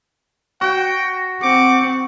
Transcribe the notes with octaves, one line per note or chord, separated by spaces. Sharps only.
F#4 G5
C4 F#5 D6